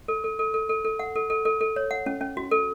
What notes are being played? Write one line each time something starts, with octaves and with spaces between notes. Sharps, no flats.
A4
A4
A4
A4
A4
A4
F#5
A4
A4
A4
A4
C#5
F#5
C#4
C#4
F#4
A4